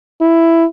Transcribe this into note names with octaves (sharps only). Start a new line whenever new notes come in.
E4